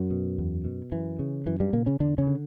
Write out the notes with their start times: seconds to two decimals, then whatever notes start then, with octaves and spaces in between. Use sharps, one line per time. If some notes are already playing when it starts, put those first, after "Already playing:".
Already playing: F#2 F#3
0.11 B2
0.38 E2
0.65 B2
0.92 F#2 E3
1.19 C#3
1.46 F#2 E3
1.60 G2 G3
1.73 A#2 C#3 A#3
1.86 C#3 C#4
2.00 E2 D3 D4
2.18 C#3 C#4
2.27 D3